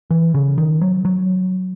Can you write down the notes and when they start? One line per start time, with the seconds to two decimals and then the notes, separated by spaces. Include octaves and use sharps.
0.11 E3
0.34 C#3
0.58 D#3
0.81 F#3
1.05 F#3